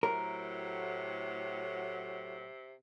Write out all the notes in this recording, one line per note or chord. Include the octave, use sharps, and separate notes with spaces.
A2 C3 F#3 A#4